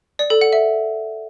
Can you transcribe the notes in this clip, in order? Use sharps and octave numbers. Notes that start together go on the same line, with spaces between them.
D5
A4
F#5
E5